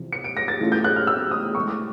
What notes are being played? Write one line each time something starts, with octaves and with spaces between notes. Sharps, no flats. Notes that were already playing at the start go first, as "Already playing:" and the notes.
Already playing: E2 C3 F3
C#7
D7
A#6
A6
A2 E3 A3 C#4 F4
G6
F#6
F6
E6
D#6
A2 E3 G#3 C#6
D6